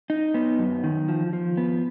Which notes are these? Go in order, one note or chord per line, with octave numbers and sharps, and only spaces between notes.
D#4
B3
F#2
D#3
F3
F3
B3